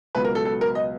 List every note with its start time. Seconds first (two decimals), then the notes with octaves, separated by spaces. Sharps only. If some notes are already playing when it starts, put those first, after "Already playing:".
0.15 C#2 B2 F#3 B4
0.25 A#4
0.35 A4
0.45 A4
0.61 A#4
0.75 D#5